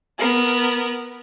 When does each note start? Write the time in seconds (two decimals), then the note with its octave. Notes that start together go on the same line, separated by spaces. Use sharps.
0.18 B3 A#4